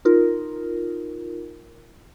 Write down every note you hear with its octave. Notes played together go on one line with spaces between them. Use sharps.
D#4 F4 A#4